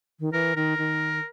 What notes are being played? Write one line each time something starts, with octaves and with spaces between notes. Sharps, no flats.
D#3
E3 A#4
D#3 A#4
D#3